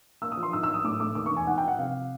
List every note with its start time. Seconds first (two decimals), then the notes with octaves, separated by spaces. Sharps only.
0.22 A#3 E6
0.32 D#6
0.37 F3
0.43 C6
0.53 G#1 E6
0.63 E6
0.69 F#3
0.74 D#6
0.84 A2 D6
1.00 A3 D6
1.15 D#2 D6
1.26 C#6
1.31 E1
1.37 G#5
1.47 G#2 F#5
1.58 G5
1.63 F3 F#5
1.78 C3 F5